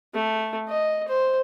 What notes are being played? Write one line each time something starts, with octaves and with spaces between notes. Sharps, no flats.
A3
D#5
C5